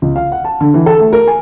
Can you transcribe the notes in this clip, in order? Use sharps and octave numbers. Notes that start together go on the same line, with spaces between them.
C#2
F5
F#5
A5
D3
E3
A4
A3
A#4
G#5